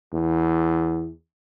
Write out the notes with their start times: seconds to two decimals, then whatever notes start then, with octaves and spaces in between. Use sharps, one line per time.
0.13 E2